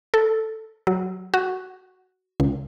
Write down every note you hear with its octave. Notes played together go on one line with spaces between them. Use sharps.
A4
F#3
F#4
C#2